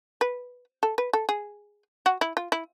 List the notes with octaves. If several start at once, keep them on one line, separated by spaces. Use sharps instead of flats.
B4
A4
B4
A4
G#4
F#4
E4
F4
E4